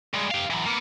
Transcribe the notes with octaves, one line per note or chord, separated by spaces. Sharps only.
G2 G#3
G4 F5
E3 F#3
A#3 B3